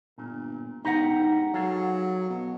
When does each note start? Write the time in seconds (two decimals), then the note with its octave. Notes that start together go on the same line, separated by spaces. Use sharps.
0.18 G1 A#2
0.85 E1 D#4 G4 F#5 A#5
1.19 G#2
1.54 F#3 G#4 A4 F5
2.30 B2